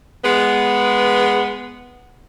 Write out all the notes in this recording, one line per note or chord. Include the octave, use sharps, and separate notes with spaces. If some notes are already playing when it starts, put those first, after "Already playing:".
G#3 B3